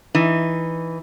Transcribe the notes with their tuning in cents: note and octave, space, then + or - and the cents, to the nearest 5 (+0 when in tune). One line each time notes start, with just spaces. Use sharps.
E3 +0 D#4 +0